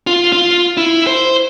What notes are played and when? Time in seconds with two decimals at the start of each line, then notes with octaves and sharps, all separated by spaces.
0.07 F4
0.33 F4
0.77 E4
1.07 C5